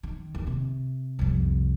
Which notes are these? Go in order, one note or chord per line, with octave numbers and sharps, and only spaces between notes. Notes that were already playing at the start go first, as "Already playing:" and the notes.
D#3
D#2
C3
C2 F2